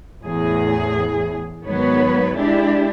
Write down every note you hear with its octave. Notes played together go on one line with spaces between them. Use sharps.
E2 A2 G#4
G#2 D#3 F#3 B3 B4 C#5
G#3 D4 E4 G4